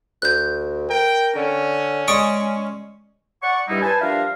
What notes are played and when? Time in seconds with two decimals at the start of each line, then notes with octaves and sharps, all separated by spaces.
0.22 D2 F#6 G6
0.90 A#4 G5
1.36 D3 C#4
2.08 G#3 D5 G#5 C#6 D#6 D7
3.42 D5 F#5 C#6
3.68 G2 G3 D#4 E4
3.82 B4 C5 G#5 A5
4.01 F3 G3 D4 A#4 E5 F5